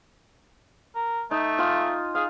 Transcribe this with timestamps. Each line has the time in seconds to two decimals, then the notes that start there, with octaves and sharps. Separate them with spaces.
0.95 A#4
1.31 A3 D#4
1.58 F4 G#5 D#6
2.15 G#4 F5